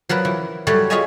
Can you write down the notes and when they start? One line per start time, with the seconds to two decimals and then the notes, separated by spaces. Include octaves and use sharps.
0.09 F3 F#3 A#4 B4
0.25 E3
0.67 F#3 G3 A3 G4 C#5 D5
0.90 F4 G#4 C#5 D#5 E5 G#5